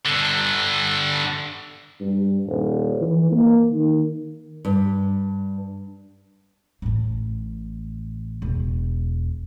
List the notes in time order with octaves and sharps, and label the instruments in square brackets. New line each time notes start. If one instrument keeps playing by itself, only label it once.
[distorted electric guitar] G2 D3
[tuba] G2
D#1
E3
A#3
D#3
[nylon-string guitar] G2
[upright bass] A1 A2
E1